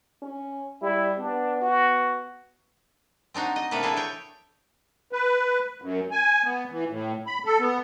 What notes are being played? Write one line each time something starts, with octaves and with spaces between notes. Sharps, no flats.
C#4
G3 E4
B3 D4
F#4
C4 D4 D#4 F#4
D#5
C3 A3 A#3 D4 A4 B4
D4 E4 G#4 A4
C#5 G5
B4
F#2
G#5
B3
E3
A2
B5
A4
B3